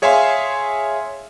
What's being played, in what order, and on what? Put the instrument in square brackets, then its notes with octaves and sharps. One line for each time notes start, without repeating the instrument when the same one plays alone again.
[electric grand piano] G#4 C#5 E5 F5 G#5 C6